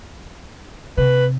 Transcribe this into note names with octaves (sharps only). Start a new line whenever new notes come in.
C3 B4